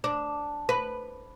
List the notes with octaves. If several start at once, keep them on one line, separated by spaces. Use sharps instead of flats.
D4
B4